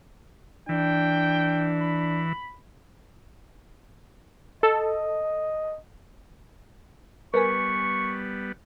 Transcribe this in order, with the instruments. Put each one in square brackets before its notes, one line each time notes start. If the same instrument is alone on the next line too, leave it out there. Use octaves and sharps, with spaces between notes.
[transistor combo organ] E3 [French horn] D4 [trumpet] G5
[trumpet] B5
[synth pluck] A4 [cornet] D#5
[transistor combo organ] G3 B3 [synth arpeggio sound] A#4 B4 G#5 [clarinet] C#6